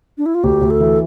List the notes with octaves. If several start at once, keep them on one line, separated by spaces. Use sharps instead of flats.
D4
E4
F4
D2 G4
D2
A4
E3